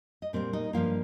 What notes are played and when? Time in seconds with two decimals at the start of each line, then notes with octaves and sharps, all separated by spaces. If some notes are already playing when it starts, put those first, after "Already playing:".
0.22 D#5
0.33 A#2 G3 A#3 C4 C5
0.53 D#4 D#5
0.73 G2 F3 A#3 F4 F5